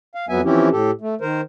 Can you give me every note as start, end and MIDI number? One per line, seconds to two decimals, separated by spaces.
0.15 0.25 77
0.29 0.41 41
0.29 0.41 54
0.29 0.41 59
0.29 0.41 76
0.29 0.41 80
0.45 0.69 52
0.45 0.69 53
0.45 0.69 60
0.45 0.69 61
0.45 0.69 64
0.45 0.69 67
0.72 0.91 45
0.72 0.91 67
0.72 0.91 69
1.01 1.15 57
1.21 1.41 51
1.21 1.41 70
1.21 1.41 72